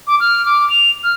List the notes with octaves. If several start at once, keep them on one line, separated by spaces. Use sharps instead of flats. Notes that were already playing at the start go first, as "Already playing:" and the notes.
D6
F6
D6
F7
F6